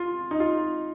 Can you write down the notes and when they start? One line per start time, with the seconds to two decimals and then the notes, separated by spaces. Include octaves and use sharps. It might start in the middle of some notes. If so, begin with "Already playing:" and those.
Already playing: F4
0.31 D#4
0.40 F4